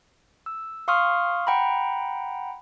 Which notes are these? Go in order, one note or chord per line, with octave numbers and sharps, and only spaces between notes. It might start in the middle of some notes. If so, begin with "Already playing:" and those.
E6
F5 C6 C#6 D#6 F6
F#5 G5 A#5 B5